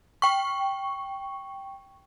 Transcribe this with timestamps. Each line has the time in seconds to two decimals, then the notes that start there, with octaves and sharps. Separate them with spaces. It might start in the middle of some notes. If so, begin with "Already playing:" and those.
0.22 G5 C#6